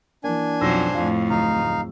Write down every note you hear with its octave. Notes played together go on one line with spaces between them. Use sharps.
E3 A#3 D4 G#5
B1 F2 F#3 C5 E6 A#6
F2 A2 F5
D1 D#4 F5